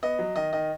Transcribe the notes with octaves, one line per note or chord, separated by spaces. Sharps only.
B3 D#5
F#3
D#3 D#5
D#3 D#5